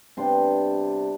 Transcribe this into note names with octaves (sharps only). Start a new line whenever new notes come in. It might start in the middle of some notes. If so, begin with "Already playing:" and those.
C3 G3 B3 D4 C6